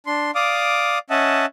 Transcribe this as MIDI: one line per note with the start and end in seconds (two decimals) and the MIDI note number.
0.07 0.31 62
0.07 0.31 84
0.35 0.99 74
0.35 0.99 77
0.35 0.99 86
0.35 0.99 87
1.10 1.46 61
1.10 1.46 75
1.10 1.46 76
1.10 1.46 78
1.10 1.46 81